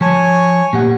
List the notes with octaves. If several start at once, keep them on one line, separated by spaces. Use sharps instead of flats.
F3 C#5 G#5 A5 C#6
A#2 G4 F#5